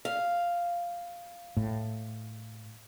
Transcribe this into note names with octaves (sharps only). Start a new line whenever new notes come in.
F5
A2